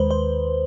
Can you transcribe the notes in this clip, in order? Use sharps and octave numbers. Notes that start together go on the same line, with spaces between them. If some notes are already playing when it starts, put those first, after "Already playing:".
Already playing: D#2 D#3 G#3 B4 C5
C5